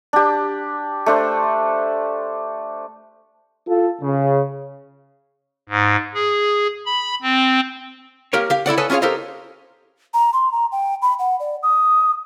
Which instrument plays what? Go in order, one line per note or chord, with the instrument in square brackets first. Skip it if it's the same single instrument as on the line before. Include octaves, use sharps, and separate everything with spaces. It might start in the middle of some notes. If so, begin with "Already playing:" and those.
[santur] D4 G4
A3 D4 C5
[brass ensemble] F4 A4
C#3
[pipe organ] G#2
G#4
B5
C4
[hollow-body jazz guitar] A#3 G4 A#4 C#5
G4 F5
E4 A4 D5 F#5
A4 B4 C#5 D#5 G#5 A5
C#4 F4 G#4 C#5 F5
G4 A4 A#4 C5 D#5 F5
[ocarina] A#5
C6
A#5
G5
B5
F#5
D5
D#6